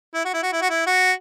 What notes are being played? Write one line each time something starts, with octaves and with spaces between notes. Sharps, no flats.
E4
F#4
E4
F#4
E4
F#4
E4
F#4